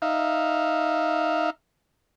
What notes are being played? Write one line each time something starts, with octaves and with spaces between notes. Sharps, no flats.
D#4 E5 F5